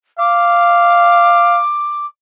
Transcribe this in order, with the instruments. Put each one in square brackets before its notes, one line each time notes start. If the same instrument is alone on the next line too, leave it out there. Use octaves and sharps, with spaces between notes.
[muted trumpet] F5 [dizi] D6